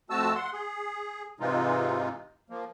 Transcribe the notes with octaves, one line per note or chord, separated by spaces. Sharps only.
F2 A3 C4 F#4 A5 E6
F#5 C6
G#4
G#2 C3 E3 G#3 D#4 F4
F3 A#3